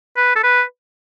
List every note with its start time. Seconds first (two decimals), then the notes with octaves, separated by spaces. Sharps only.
0.17 B4
0.36 A4
0.44 B4